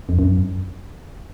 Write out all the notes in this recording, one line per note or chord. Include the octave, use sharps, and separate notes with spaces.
F2
F#2